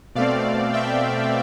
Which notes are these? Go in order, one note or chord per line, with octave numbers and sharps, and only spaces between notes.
B2 A3 C4 D5 F5
E5 G5